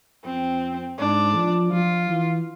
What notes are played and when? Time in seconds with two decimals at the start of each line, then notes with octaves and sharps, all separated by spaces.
0.24 F2 C4
0.99 G#2 D4
1.36 F3
1.72 F3 F4
2.09 E3